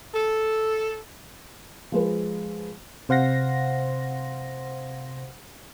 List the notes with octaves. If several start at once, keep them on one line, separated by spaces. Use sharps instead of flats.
A4
F3 G#3 B4
C3 C5 F5 F#5 C6 A#6